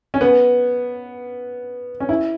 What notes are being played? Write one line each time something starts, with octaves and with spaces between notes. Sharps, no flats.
C#4
B3
C#4
E4